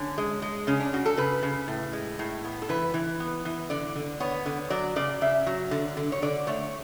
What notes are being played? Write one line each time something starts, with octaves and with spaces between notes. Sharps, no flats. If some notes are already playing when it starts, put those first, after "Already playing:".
Already playing: D3 C#4
G#3
G#3
C#3 C#4
D4
C#3 F#4
A4
C#3 B4
C#3
A2
G#3
A2
B3
A4
E3 B4
E3
B3
E3
D3 D5
D3
B3 C#5
D3
F#3 D5
C#3 D5
C#3 E5
F#3
D3
D3
C#5
D3 D5
A3 C#5